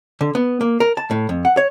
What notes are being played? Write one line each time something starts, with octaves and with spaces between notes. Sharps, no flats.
D3
B3
A#3
A#4
A5
A2
F2
F#5
C#5